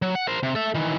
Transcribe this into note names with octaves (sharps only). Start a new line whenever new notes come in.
F#3
F#5
A#4 C5
C3
A4 E5
D#3 E3